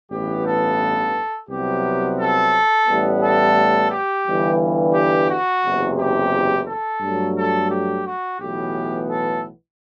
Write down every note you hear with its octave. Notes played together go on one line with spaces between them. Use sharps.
A1 G2 E3 B3 G4
A4
C2 C3 F#3 B3 G4
A4
A1 A2 G3 B3
A4
G4
G1 G2 E3
G4
F#4
F#1 E2 C3
G4
A4
G2 F#3 A3
A4
G4
F#4
B1 A2 E3 B3 G4
A4